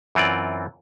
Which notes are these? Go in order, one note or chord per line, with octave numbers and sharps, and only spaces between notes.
F#2 E3 C4 F4 D5